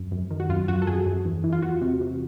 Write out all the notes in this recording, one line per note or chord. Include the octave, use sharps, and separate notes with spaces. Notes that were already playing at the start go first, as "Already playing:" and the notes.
Already playing: F#2
F#2
D#3
F#4
F#2 F4
F#2 F#4
A4
F#2 G#4
F#2
E2
E3
F4
E2 F#4
C3
C3